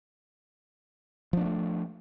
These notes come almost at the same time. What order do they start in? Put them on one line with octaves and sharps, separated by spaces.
F3 D4 A#3 A3